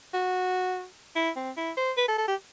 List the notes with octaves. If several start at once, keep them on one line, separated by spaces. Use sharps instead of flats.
F#4
E4
C4
E4
C5
B4
A4
A4
G4